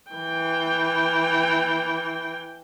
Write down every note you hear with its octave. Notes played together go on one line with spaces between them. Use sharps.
E3 G5